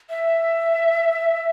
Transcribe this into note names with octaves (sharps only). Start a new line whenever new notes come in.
E5